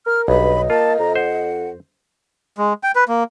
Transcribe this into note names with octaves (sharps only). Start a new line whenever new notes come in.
A#4 F6
B1 G2 D#5 B5
A#3 F4 A5
F2 A#5
C5 F#5
G#3
G5
B4
A#3